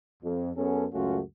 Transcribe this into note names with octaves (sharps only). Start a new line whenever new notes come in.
F2
F#2 B3 C#4 G#4 A4
C#2 F#2 A3 C#4 F4 F#4